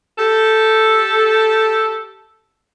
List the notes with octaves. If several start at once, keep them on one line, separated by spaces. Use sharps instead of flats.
G4 A4